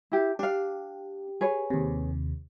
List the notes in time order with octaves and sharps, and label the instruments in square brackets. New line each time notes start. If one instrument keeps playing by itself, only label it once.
[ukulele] E4 G4
[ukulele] D4 F5 [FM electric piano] G4
[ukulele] G#4 B4 C#5
[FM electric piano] D#2 C3